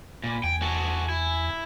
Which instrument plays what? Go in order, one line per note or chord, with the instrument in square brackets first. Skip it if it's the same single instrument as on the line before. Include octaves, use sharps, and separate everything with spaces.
[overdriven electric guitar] A#2 [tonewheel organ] B5
[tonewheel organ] E2 G#5 [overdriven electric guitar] G5
[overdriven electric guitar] F#4 A4
E4